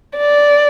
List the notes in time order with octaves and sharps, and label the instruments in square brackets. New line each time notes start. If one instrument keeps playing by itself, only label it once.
[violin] D5